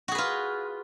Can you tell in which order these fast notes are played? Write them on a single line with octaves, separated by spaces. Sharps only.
F#4 G#4 B4 F4